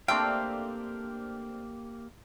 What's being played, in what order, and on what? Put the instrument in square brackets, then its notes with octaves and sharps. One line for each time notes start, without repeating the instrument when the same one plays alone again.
[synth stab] A3 C4 D4 [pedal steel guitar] A#3 G4 F5 [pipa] G5